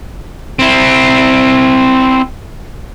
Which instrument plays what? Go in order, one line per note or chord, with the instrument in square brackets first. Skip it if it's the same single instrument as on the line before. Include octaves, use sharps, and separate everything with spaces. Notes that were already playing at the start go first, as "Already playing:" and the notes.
[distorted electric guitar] C4 E4